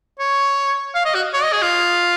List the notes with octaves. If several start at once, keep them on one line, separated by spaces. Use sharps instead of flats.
C#5
F5
D#5
F#4
C#5
D#5
G#4
F4